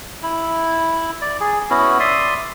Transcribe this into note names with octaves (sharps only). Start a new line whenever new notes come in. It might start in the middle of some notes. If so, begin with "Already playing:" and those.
E4
D5
G#4
B3 C#4 E4 F#4
D5 E5 C6 D#6